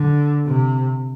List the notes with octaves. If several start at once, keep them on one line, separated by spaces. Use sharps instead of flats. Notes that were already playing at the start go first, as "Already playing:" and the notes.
Already playing: D3
C3